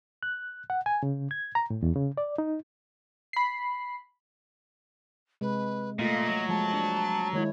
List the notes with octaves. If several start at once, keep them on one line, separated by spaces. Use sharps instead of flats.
F#6
F#5
G#5
C#3
G#6
A#5
A2
E2
C#3
D5
D#4
B5 C7
C3 G#3 B4
A#2 A3 A#3 F4 D#5
F#3
F3 G#3 A5
D4
D#3 G#3 E4 C#5